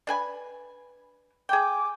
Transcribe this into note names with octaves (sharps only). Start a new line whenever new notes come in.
D4 B4 G#5
G#4 G5 G#5 D6